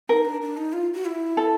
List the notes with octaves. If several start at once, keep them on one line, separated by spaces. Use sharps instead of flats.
D#4 A#4
D4
D4
D#4
F4
F#4
E4
A4